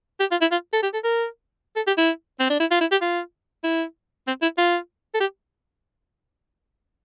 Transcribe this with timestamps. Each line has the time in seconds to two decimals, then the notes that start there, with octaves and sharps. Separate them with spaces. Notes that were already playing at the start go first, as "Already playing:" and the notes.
0.20 G4
0.31 F4
0.41 E4
0.51 F4
0.73 A4
0.83 G4
0.93 A4
1.04 A#4
1.76 A4
1.87 G4
1.98 E4
2.40 C4
2.50 D4
2.60 E4
2.71 F4
2.81 E4
2.91 G4
3.02 F4
3.64 E4
4.27 C4
4.42 E4
4.58 F4
5.14 A4
5.21 G4